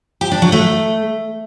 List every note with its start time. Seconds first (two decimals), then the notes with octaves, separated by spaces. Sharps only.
0.21 G4
0.31 D4
0.42 F#3
0.52 A3